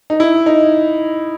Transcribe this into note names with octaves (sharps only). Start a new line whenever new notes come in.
D#4
E4
D#4